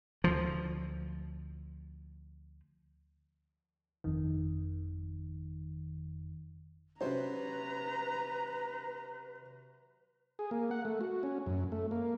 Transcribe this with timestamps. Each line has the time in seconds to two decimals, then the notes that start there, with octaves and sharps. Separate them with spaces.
0.24 D2 F3
4.04 G1 F2 D#3
7.01 C3 F#3 C#4 B4 C5 A#5
10.39 G#4
10.51 A#3
10.71 F#5
10.85 A3
11.01 F#4
11.23 C#4
11.46 F#2
11.72 A3
11.91 A#3